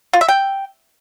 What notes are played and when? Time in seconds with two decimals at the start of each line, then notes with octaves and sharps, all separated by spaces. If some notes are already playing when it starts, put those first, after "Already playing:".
0.13 F4
0.21 E5
0.29 G5